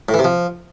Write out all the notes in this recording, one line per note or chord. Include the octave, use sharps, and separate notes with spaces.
A2
E3
C3
F3